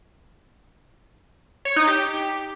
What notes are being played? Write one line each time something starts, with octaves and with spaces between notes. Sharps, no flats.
C#5
D#4
G4